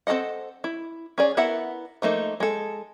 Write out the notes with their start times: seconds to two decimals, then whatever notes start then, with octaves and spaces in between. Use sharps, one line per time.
0.07 C4 F4 A4 D#5 F#5
0.64 E4
1.18 C#4 G#4 D5
1.37 B3 E4 A#4 E5 F#5
2.02 F3 A3 A#3 D#4
2.40 G#3 A4